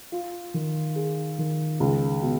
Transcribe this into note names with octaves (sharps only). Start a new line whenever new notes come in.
F4
D#3
G#4
D#3
C#2
B2